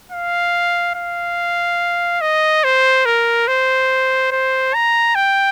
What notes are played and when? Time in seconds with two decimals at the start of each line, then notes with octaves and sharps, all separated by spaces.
0.12 F5
0.95 F5
2.21 D#5
2.64 C5
3.05 A#4
3.48 C5
4.32 C5
4.74 A#5
5.15 G5